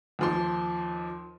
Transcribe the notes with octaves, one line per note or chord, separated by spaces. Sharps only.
D#2 F3 C6